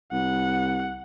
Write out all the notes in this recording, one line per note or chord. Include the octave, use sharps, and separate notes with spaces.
C2 F#5